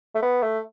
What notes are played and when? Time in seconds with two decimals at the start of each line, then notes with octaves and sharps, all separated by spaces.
0.15 A3
0.22 B3
0.42 A3